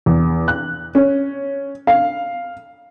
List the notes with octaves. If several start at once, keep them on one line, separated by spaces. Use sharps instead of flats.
E2
F#6
C#4
F5